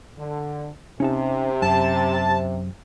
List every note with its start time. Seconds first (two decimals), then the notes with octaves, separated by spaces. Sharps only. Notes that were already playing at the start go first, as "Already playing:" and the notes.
0.18 D3
1.00 C3 C#4 D#4 A5
1.62 F#2 A5